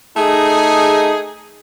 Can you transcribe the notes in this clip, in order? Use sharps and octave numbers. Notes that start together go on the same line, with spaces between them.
A3 D#4 G#4